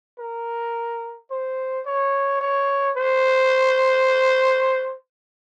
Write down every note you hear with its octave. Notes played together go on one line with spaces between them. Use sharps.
A#4
C5
C#5
C#5
C5